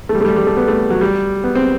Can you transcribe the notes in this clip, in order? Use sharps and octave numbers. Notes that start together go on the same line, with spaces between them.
A3
G3
A3
G3
G3
A3
B3
A3
F#3
G3
B3
C4